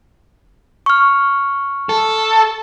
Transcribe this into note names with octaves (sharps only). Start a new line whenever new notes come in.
C#6 F6
A4